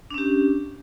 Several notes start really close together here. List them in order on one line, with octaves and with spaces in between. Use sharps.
D4 C#4 G4